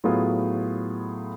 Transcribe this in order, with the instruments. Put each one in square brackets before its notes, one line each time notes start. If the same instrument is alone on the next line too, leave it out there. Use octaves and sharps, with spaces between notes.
[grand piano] A2 F#3 B3 F4 G#4